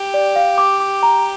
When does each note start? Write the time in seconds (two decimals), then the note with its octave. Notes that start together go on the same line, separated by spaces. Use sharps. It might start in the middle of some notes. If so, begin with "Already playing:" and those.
Already playing: G4
0.14 D5
0.36 F5
0.58 D6
0.80 D6
1.03 A#5